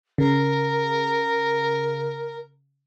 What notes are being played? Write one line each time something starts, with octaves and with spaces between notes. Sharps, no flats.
C#3 A#4